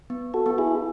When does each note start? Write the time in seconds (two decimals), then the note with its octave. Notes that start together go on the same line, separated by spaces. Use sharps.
0.10 B3
0.34 F#4 A4
0.46 B3
0.58 E4 G#4